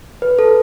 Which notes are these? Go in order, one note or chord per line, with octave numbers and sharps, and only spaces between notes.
B4
A4